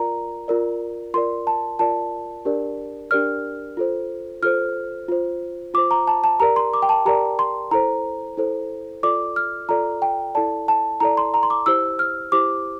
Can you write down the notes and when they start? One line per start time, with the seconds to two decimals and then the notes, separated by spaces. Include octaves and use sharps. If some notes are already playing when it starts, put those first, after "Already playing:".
Already playing: F4 A#4 D5 A#5
0.48 F4 A#4 D5
1.14 F4 A#4 D5 C6
1.47 A5
1.79 F4 A#4 D5 A5
2.45 D4 G4 A#4 D5
3.11 D4 G4 A#4 D5 F6
3.77 F4 A4 C5
4.43 F4 A4 C5 F6
5.08 F4 C5
5.74 F4 C5 D6
5.91 A#5
6.07 A5
6.24 A5
6.40 G4 A#4 D5 A#5
6.56 C6
6.74 D6
6.82 G5
6.89 A5
7.06 G4 A#4 D5 A#5
7.39 C6
7.71 E4 A4 C5 A#5
8.37 E4 A4 C5
9.03 F4 A4 D5 D6
9.36 F6
9.69 F4 A4 D5 A#5
10.02 G5
10.35 E4 A4 D5 A5
10.68 A5
11.00 E4 A4 D5 A#5
11.17 C6
11.34 A#5
11.43 C6
11.50 D6
11.66 E4 G4 C5 E6
11.99 F6
12.32 E4 G4 C5 D6